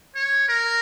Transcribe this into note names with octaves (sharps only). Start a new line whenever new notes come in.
C#5
A#4